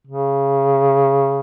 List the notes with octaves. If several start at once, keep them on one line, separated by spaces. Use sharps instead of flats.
C#3